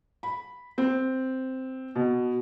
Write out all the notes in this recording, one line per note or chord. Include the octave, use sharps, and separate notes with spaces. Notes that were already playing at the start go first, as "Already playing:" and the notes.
B5
C4
B2